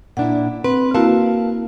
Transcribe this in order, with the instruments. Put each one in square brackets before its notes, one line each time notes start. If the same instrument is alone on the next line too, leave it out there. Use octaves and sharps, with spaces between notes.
[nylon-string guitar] A#2 D4 E4 [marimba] F#5
[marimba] C4 [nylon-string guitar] B4
[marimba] A#3 E4 F#4 [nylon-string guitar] A#4 F5 A5